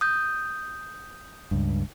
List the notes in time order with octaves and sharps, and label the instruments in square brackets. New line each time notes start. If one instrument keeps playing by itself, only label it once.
[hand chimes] D#6 G6
[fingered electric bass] C#2 G2